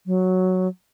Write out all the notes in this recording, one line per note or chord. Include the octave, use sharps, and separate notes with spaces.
F#3